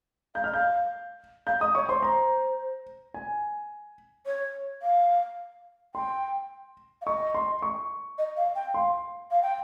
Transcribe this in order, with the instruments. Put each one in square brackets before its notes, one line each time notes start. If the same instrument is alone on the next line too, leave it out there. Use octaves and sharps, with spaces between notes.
[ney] F5 [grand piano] G6
[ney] D#5 [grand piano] F6
[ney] F5 [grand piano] G6
[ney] F5 [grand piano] G6
[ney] D#5 [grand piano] D#6
[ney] C#5 [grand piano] C#6
[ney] C5 [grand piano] C6
[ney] C5 [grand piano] A#5
[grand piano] G#5
[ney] C#5
F5
[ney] G5 [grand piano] C6
[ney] F5
[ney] D#5 [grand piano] C#6
[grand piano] C6
C#6
[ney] D#5
F5
G5
[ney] F5 [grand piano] C6
[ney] F5
G5